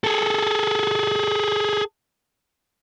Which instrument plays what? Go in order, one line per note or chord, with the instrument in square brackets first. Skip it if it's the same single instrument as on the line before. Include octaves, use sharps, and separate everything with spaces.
[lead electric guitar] G#4 A4